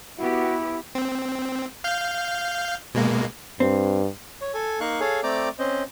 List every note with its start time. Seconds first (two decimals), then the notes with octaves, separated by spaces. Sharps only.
0.19 B3 E4 F#4 G4
0.95 C4
1.84 F5 F6 G6
2.94 B2 G#3 A#3
3.60 G2 C4
4.41 C#5
4.54 A4 G#5
4.80 A#3 D#4 F5 C#6 F#6
5.00 G#4 A4 C#5 F5 G#5
5.23 A3 C4 D5 G5 A#5 D6
5.59 C4 C#4 C5 D#5